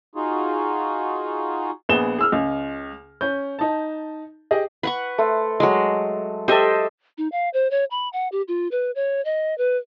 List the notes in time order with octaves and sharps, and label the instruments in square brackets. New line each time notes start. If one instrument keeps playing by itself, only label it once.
[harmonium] D#4 F4 F#4 G#4
[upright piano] A#1 B3 G#4 E7 G7
G#4 E6 F6
C#2
C#4 G6
D#4 A5
G4 G#4 D#5
[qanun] B4 F#5 C#6
[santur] A3 C5
[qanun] F#3 G#3
[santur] G4 A4 [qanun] C5 D#5 E5
[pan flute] D#4
F5
C5
C#5
B5
F#5
G4
F4
B4
C#5
D#5
B4